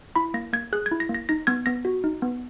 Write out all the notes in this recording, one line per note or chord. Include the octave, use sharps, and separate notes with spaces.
E4 B5
A#3 A#6
A#3 G#6
G#4 F#6
G#6
E4
A#6
A#3
A#6
D#4 A#6
B3 G#6
B3 A#6
F#4
D#4
B3